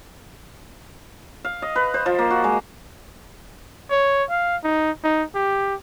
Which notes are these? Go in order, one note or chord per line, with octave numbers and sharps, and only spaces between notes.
F5
D#5
B4
C5
F3
A#3
F#4
G#3
C#5
F5
D#4
D#4
G4